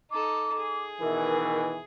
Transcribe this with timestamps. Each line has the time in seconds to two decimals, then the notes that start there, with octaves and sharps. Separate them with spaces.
0.11 D#4 A4 D6
0.57 G#4
1.01 B2 D#3 E3 A#4